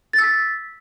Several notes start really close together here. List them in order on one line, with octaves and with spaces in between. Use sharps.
A6 E6 B6